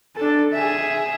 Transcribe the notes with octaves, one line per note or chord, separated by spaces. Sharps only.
D4 A4
G#4 E5